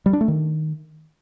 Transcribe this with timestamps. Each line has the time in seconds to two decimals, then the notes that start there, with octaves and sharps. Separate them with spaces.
0.06 G3
0.13 D4
0.21 A3
0.28 D#3